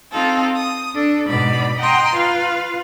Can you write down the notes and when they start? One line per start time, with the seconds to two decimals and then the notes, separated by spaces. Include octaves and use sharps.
0.11 C4 D#4 F4 A4
0.56 D#6
0.94 D4 A4
1.27 G#2 B2 D5 B5
1.79 D#5 F#5 G5 A#5 C6
2.16 F4 B4 F5